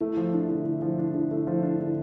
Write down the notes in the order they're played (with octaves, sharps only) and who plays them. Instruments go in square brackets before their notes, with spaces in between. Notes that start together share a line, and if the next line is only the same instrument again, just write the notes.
[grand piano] A3 [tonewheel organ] E4
[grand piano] F3
D4
D3
A3
F3
D4
D3
A3
F3
D4
D3